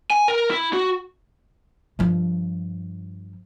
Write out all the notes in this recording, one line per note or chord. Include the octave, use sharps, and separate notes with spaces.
G#5
A#4
E4
F#4
G2 F3